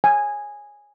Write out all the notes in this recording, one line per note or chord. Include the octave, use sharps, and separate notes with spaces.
G#5